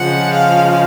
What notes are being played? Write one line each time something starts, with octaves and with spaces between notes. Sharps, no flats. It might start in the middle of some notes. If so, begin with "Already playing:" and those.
Already playing: C#3 F3 G#3 F#5
F5